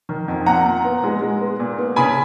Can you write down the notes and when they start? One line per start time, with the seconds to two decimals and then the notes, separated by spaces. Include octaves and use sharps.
0.09 D#3
0.28 F2
0.46 A#2 F#5 A#5
0.66 A#2
0.84 B3
1.03 G#3
1.22 G#3
1.41 B3
1.60 A#2
1.78 B3
1.96 C#3 G#5 B5